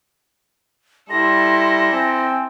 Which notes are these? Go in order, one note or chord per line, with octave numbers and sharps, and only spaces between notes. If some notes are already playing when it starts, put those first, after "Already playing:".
G3 E4 A4 C6 A#6
C4 G#5